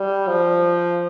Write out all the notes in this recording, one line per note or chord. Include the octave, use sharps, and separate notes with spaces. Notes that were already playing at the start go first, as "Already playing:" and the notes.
Already playing: G3
F3